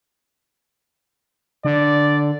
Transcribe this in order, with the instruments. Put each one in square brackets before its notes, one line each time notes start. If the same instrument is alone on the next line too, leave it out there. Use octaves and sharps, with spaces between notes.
[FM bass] D3 [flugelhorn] D5